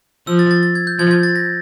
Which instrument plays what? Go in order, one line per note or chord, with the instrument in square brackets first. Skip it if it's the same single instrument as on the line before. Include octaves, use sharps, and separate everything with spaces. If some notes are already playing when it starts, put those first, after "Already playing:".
[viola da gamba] F3 [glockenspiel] E6
[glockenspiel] A6
A6
A6
G#6
G6
[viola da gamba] F3 [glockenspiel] G#6
[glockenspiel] G#6
A6
A#6